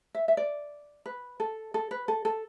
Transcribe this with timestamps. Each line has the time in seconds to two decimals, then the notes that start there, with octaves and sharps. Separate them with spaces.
0.15 E5
0.28 E5
0.37 D5
1.06 B4
1.40 A4
1.74 A4
1.91 B4
2.08 A4
2.25 A4